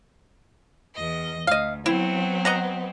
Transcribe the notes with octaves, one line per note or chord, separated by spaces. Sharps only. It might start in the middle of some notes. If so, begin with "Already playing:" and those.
E2 D#5
D2 D#5 F5
F#3 B3 C4 E4
D#5 F#5 A#5